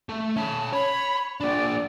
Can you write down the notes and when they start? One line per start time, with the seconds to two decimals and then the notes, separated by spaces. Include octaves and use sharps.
0.09 A3
0.36 C#4 A5 B5
0.73 C#5 B5
1.40 A#3 D4 D5